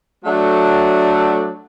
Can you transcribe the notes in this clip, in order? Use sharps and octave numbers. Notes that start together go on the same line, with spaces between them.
F#3 A3 D4